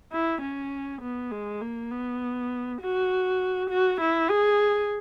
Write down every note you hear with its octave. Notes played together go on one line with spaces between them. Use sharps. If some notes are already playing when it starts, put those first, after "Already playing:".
E4
C#4
B3
G#3
A#3
B3
F#4
F#4
E4
G#4